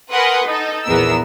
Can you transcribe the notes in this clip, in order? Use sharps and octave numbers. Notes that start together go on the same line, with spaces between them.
A#4 B4 F#5 G#5 C6 D#6
D#4 A4
A#1 E2 B3 A#4 E6